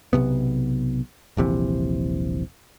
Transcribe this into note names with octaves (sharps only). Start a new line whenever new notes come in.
B1 C3 B3
D#1 A#1 C3 E3